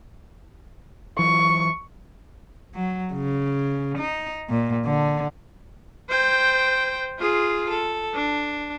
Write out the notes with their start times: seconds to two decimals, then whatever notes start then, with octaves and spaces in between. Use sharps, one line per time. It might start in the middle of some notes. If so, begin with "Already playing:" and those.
1.19 E3 F#3 C#6
2.75 F#3
3.13 C#3
3.98 D#4
4.50 A#2
4.85 D3
6.09 C5 G5
7.19 F4 G#4
7.69 A4
8.14 D4